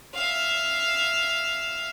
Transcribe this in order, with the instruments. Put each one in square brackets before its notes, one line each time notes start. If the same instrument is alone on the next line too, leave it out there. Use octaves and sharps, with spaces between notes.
[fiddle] E5 F5